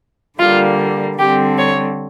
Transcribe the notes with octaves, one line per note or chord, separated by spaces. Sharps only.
D3 G3 A#3 F4
D3 G3 C4 G4
C#5